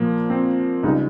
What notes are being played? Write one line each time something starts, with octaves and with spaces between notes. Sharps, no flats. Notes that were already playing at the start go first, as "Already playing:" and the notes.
Already playing: A#2 F3 A#3
C4
C#2 C#3 G3 D#4